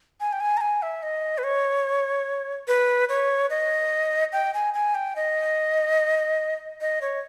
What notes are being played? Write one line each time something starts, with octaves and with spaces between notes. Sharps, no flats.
G#5
G5
G#5
A#5
G#5
E5
D#5
B4
C#5
B4
C#5
D#5
G5
G#5
G#5
G5
D#5
D#5
C#5